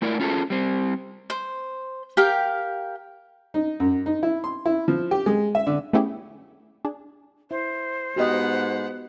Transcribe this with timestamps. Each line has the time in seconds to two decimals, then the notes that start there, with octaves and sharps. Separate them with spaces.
0.02 A3 E4 A#4 D5
0.20 C#4 F4 G#4 A4
0.50 G3 C4
1.30 C5
2.17 G4 A#4 F5 G5
3.54 D#4
3.80 F#2
4.06 D#4
4.23 E4
4.44 C6
4.66 E4
4.88 F3
5.11 G4
5.26 G#3
5.55 E5
5.67 D3
5.93 A3 B3 C#4 E4 G4 G#4
6.85 D4 G#4
7.51 E4 C5
8.16 G#2 B3 F#4 G4 D#5 F#5